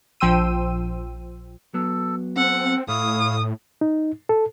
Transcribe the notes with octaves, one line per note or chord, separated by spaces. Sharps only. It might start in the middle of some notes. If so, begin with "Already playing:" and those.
A#1 F3 G5 C6 E6 D#7
F#3 B3 A4
C4 A4 F#5
A2 A3 E4 C#5 F5 D#6
D#4
A4